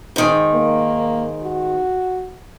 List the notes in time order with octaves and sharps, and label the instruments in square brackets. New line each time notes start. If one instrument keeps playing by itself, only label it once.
[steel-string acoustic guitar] G#2 D#3
[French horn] A#3
F#4